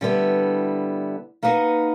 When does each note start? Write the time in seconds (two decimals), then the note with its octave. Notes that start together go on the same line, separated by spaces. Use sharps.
0.01 D3 G3 B3 E4
1.43 A#3 D#4 F#4 B4 D#5